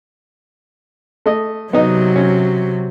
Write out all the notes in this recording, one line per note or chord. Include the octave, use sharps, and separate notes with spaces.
A3 D#5
C3 F#3 B3 D#4
C#4